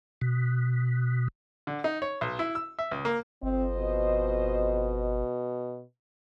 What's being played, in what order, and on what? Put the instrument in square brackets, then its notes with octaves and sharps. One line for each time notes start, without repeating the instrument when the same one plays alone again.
[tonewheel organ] B2
[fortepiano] D3
D#4
C#5
B1
E4
E6
E5
C#2
A#3
[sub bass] G1 [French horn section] F2 C5 D#5 [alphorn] C4
[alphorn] B2